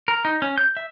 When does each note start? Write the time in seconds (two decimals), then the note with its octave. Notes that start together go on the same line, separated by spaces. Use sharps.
0.08 A#4
0.25 D#4
0.42 C#4
0.58 G6
0.77 E5